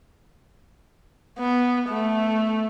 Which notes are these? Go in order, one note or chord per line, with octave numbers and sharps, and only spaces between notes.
B3
A3